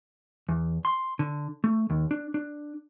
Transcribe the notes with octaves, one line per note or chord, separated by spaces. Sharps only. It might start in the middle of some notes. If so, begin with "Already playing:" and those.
E2
C6
D3
A3
D#2
D4
D4